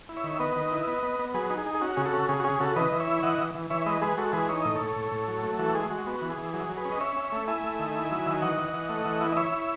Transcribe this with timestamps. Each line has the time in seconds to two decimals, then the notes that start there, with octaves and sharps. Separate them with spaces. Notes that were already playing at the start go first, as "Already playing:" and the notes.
0.09 E4
0.16 C#5 E5
0.24 D#3
0.39 B3 B4 D#5
0.56 D#3
0.72 E4
0.87 B3
1.03 B3
1.19 B3
1.34 F#3 G#4 B4
1.50 D#4
1.58 G#4
1.66 D#4
1.75 G#4
1.81 C#4 F#4
1.97 C#3 G#4
2.05 F#4 A4
2.13 C#4
2.29 C#3 G#4
2.40 F#4
2.44 C#4 G#4
2.60 C#3 F#4 A4
2.76 E3 B4 D#5
2.92 E3
3.00 C#5 E5
3.08 E4
3.23 E3 D#5 F#5
3.39 E3
3.55 E3
3.70 E3 C#5 E5
3.82 E5
3.86 G#3 B4 D#5
4.02 G#3 G#4 B4
4.17 G#3 F#4 A4
4.33 E3 G#4 B4
4.49 D#4 C#5
4.62 A2 D#5
4.75 A4 C#5
4.81 A2
4.96 A2
5.12 A2
5.28 F#3
5.43 A3
5.59 E3 F#4 A4
5.75 G#3 G#4
5.90 G#3 F#4
6.07 B3 F#4
6.22 E3
6.30 G#4
6.38 E3
6.54 F#3 G#4
6.69 F#3
6.77 G#4 B4
6.85 C#4
6.92 D#5
7.00 C#4 C#5 E5
7.16 C#4
7.24 C#5 E5
7.32 A3
7.47 E4 E5 G#5
7.64 A3
7.79 D#3
7.95 E4
8.11 F#3
8.26 D#3 G#5
8.42 E3 D#5 F#5
8.58 E3
8.74 E3
8.89 A3
9.06 E3
9.21 E4
9.32 D#5
9.37 E4 C#5 E5
9.52 E4